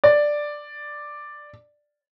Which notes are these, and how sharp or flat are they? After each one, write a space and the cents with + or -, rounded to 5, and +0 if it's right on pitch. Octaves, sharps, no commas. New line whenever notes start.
D5 +5